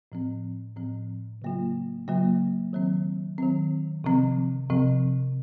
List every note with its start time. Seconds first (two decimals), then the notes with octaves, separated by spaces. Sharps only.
0.12 A2 F3 C4
0.76 A2 F3 C4
1.42 C#3 F#3 A#3 F4
2.08 C#3 F#3 A#3 F4
2.73 D#3 F#3 C4
3.38 D#3 F#3 C4
4.04 C3 F3 C4
4.70 C3 F3 C4